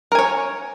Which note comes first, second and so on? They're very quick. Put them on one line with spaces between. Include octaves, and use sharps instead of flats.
A#4 G#5 C#5